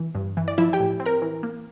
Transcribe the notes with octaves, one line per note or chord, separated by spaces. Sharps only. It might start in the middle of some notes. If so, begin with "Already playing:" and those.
Already playing: E3
G2
E3
D5
F3 E4 E5
G4 G5
A2
C4
A#4 A#5
E3
A#3